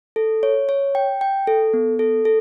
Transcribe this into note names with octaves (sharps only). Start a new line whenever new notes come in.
A4
C#5
C#5
G5
G5
A4
B3
A4
A4